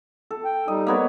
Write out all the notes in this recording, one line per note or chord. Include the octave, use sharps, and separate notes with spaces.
A4
G5
G3 D#4 D#5
A#3 B3 C#5